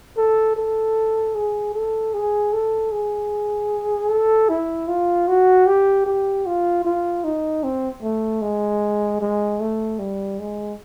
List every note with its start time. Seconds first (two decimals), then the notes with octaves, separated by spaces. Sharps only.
0.17 A4
0.56 A4
1.35 G#4
1.74 A4
2.14 G#4
2.53 A4
2.92 G#4
4.10 A4
4.49 E4
4.88 F4
5.28 F#4
5.67 G4
6.07 G4
6.46 F4
6.85 F4
7.24 D#4
7.64 C4
8.03 A3
8.42 G#3
9.21 G#3
9.60 A3
9.99 G3
10.39 G#3